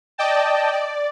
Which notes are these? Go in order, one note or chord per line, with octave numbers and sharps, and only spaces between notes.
D5 D#5 G5 A5
D5